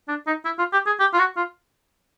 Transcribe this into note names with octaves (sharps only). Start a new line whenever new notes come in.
D4
D#4
E4
F4
G4
G#4
G4
F4
F#4
F4